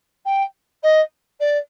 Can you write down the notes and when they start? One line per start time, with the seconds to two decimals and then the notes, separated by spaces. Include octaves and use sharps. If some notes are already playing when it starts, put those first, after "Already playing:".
0.25 G5
0.83 D#5
1.40 D5